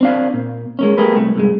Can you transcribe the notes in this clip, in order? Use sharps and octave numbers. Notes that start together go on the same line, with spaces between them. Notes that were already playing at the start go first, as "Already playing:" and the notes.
C4 D4 F5
A#2
G#3 A#3 C#4
A3 G4 G#4 A#4 B4
C2 A3
C2 G2 G#3